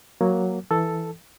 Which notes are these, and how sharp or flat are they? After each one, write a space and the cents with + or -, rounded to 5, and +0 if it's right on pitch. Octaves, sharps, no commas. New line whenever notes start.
F#3 +0 A#3 +0
E3 +0 A4 +0